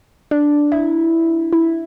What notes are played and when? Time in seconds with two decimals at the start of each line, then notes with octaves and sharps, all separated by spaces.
0.31 D4
0.72 E4
1.53 E4